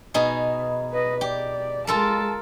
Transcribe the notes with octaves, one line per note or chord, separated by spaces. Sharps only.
B2 D#4 G#4
B4 D#5
G4 D5
G#3 F4 A4 A#4 A5